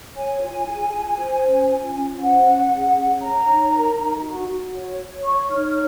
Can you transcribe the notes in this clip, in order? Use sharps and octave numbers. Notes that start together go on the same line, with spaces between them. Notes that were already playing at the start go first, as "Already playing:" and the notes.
C#5 G#5
F4
G#4
F4
C5
C#4
F4
C#4
C5 F#5
C#4
G#4
C#4
C#5 A#5
D#4
A#4
D#4
F#4
F#4
C#5
C#5
C#5 C#6
D#4 F6